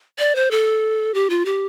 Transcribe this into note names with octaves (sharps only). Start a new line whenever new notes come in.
D5
C5
A4
G4
F4
G4